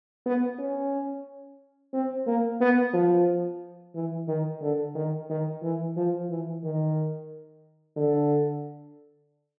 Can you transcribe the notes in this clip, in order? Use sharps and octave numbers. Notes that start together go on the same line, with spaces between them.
B3
C#4
C4
A#3
B3
F3
E3
D#3
D3
D#3
D#3
E3
F3
E3
D#3
D3